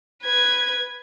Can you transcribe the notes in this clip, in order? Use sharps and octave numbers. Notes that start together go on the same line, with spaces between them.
B4 G#6